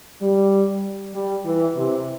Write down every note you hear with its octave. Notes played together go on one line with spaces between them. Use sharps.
G3
G3
E3
C3